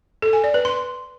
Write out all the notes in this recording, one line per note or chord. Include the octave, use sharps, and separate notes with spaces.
A4
G#5
D5
B4
C6